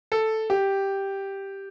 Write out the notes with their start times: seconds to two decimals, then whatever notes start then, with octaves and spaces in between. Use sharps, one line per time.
0.12 A4
0.50 G4